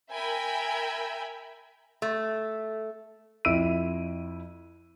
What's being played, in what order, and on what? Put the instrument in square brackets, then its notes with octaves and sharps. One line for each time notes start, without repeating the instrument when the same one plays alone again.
[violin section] A#4 E5 G5 G#5 B5
[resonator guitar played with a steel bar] A3
[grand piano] F2 E4 E6 D7 D#7